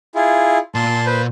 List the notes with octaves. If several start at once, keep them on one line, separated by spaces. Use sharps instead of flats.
E4 F4 G#4
A#2 A5 C6
B4 C5